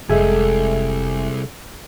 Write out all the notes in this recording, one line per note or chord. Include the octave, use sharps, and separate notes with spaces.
F1 C2 G#3 A3 G#4 E5 G#5